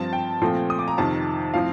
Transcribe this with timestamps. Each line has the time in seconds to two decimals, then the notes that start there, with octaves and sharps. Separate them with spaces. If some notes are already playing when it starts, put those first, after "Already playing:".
Already playing: G2 F3 C4 A5
0.13 G5
0.42 A#2 F3 A3 C4
0.70 D#6
0.79 D6
0.88 A#5
0.98 F2 C3 D#3 A5
1.54 A2 F3 C4 F5